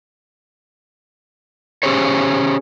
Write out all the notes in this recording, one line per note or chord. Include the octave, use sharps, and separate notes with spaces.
C#4 G4 G#4 C5 C#5